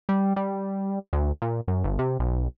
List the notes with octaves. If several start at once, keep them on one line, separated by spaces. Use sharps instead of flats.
G3
G3
D2
A#2
F#2
G1
C3
B1